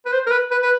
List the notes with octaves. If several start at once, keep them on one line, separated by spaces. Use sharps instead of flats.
B4
C5
A#4
B4
B4
B4